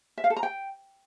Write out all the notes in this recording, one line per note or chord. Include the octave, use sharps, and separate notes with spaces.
E5
F5
A4
A#5
G5